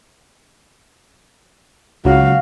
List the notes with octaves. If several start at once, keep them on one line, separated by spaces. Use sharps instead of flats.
C#2 F#3 F#4 F5